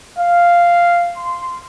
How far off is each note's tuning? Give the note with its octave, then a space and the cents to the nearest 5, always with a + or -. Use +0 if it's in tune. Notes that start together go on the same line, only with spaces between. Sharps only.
F5 -5
C6 -10